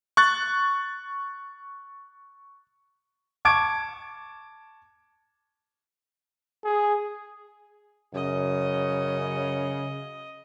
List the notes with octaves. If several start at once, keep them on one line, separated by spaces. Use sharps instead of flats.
C#6 F#6 A6
A5 C#6 D6 G#6 D7
G#4
F#2 C#3 D#5